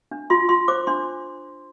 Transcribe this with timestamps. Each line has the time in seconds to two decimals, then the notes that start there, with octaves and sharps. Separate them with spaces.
0.11 D4
0.30 F4 C6
0.49 F4 C6
0.68 C5 D6
0.87 D4 C6